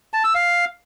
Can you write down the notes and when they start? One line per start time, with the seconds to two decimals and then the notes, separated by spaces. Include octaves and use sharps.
0.14 A5
0.24 E6
0.35 F5